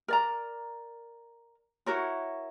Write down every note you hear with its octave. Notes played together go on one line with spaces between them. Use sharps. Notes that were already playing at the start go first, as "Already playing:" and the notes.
A#4 D5 A#5
E4 F#4 A#4 C#5